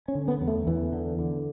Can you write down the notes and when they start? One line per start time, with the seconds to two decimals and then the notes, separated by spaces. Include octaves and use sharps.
0.08 C#4
0.15 D3
0.28 B3
0.41 E2
0.48 A3
0.67 E2 E3
0.93 D3
1.19 D3